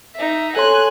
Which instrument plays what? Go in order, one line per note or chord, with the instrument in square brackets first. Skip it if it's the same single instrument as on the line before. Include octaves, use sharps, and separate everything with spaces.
[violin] D#4 E5
[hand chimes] A4 C#5 C6 [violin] G#5 F#6